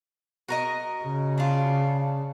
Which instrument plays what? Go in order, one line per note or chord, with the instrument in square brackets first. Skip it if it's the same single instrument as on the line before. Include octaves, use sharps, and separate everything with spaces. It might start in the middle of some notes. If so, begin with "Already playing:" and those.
[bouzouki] F#4 A#4 D#5
[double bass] C#3
[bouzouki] D4 F4